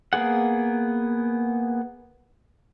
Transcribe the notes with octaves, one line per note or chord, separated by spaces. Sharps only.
A#3 B3 G#4 F#5